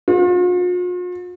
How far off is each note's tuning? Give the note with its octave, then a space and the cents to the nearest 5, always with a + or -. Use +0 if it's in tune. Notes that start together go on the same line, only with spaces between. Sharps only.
F4 +45